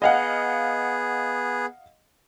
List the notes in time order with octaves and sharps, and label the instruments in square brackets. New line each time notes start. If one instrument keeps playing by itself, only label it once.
[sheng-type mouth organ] B3 G#4 [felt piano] D#5 F5 F#5